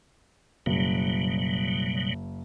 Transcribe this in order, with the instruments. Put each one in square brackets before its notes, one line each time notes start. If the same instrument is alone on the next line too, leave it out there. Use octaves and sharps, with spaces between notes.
[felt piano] F#1 [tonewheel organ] B2 F#3 G3